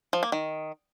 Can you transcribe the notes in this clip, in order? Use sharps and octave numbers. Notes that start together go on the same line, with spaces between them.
F3
A#3
D#3